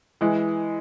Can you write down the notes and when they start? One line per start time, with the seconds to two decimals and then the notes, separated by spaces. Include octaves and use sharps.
0.21 E3 G#3